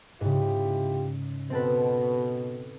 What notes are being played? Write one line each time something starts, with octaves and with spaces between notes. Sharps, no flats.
G#2 C#3 E4 F4 G4
B2 C4 A4 B4